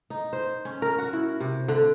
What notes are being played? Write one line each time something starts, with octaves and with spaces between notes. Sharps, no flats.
D#4
C5
C#4
A#4
F#4
E4
C3
D3